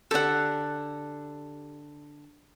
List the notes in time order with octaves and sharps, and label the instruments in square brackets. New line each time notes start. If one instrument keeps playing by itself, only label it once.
[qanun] D3 G4 [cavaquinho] A4 F#5